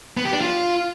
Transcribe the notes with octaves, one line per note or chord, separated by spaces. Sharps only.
B3
G4
D4
F4